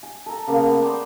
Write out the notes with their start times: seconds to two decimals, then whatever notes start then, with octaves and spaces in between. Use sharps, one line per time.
0.03 G#5
0.26 A4 A#5
0.47 C#3 A#3 B3
0.67 B3
0.81 C5 D5 G5 A#5